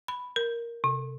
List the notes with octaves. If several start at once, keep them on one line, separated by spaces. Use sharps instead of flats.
B5
A#4
C3